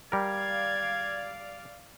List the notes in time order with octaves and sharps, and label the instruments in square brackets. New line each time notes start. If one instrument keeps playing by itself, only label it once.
[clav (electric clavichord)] G3 A#4 [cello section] D5 F5 [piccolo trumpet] G#6